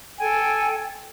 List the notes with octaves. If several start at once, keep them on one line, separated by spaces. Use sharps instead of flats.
A4 G5 G#5